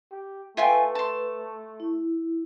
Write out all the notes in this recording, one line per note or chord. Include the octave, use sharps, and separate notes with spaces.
G4
A3 F4 B4 E5 G5 G#5 C6
A5 C6
E4